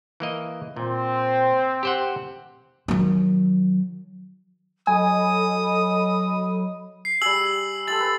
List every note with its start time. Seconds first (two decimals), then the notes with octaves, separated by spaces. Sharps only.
0.20 E3 A#3 D#5
0.76 A#2 C4
1.83 G4 C5 F#5
2.88 D#3 F#3
4.87 F#3 A4 D#5 G#5 B5 D#6
7.05 C7
7.22 G3 G#4 E6 F#7
7.87 G#3 G4 A4 A6 F#7
8.00 B4